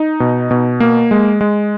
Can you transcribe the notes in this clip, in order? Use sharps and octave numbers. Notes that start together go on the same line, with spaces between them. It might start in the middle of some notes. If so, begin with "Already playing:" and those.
Already playing: D#4
B2
B2
A#3
G#3
G#3